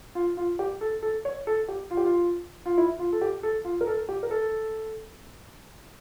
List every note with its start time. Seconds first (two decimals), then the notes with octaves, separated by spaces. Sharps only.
0.15 F4
0.37 F4
0.59 G4
0.81 A4
1.03 A4
1.25 C#5
1.47 A4
1.68 G4
1.91 F4
1.97 G4
2.05 F4
2.66 F4
2.78 E4
2.99 F4
3.13 A4
3.21 G4
3.43 A4
3.65 F4
3.81 A#4
3.87 A4
4.09 G4
4.23 A#4
4.31 A4